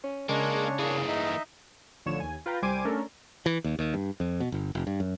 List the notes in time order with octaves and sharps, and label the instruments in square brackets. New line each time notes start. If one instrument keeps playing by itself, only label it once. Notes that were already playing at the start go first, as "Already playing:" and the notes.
[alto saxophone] C#4
[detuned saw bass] C#3 [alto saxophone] G#3 [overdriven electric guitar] A#3 [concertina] D4 C#5
[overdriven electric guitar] E3 A#3 [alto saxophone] G#4
[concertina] D#4 D#5 E5
[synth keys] A1 D3 F3 C#5 E7
D#2 G#5
F4 B4 G5 A#5
C2 G3 C5 G#5 D6 D#7
A3 C#4 D4 A4 A#4
[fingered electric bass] E3
D#2
D#2
G2
F2
B2
G1
F1
G2
F#2